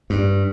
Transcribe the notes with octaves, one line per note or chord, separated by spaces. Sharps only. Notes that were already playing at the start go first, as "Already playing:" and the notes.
G2